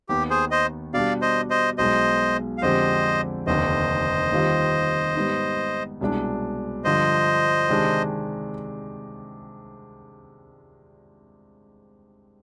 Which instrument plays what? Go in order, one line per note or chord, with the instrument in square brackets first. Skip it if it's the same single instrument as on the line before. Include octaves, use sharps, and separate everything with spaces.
[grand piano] D#2 D#3 B3 [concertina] G4
[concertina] G#4 C5
C5 D#5
[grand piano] B2 G3 D4 G4 [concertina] D5 F5
[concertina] C5 D#5
C5 D#5
[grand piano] B1 B2 G#3 [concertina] C5 D#5
[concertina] F5
[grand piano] F2 D3 G#3 C4 G4 [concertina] C5 D#5
[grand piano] F1 D#2 D3 [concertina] C5 D#5
[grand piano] D#2 D#3 G3 C4 F4
G#2 G3 B3 D#4
C2 B2 G#3 D4
[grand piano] G2 D3 F3 [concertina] C5 D#5
[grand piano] C3 D#3 G#3 D4